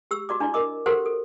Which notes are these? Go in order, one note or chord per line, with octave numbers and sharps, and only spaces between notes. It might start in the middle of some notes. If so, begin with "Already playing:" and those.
G4 E6
F#4 D5 D6
D4 E4 D5
A#4 D#5 D6
F#4 G4 A4 A#4 C5 F#5
A4